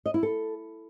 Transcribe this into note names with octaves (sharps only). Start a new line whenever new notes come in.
D#5
E4
A4